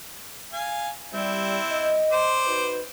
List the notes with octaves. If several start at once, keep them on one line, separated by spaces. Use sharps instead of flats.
F5 G#5
G3 C4 E4
D#5
C5 D5
D#4 F#4 B4